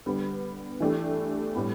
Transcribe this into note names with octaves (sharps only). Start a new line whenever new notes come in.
D3 G3 B3
E3 A3 D4 G4
A2 G3 B3